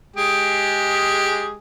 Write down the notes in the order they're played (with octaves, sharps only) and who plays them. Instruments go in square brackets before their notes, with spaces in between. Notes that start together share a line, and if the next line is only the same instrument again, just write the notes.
[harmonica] G#3 G4 G#4